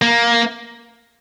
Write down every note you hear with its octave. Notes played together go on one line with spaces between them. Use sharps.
A#3